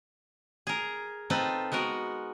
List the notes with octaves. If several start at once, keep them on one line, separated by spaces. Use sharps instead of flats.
G#4 A#4
C4 D#4 F4 A4 B4
G#3 B3 F#4 A#4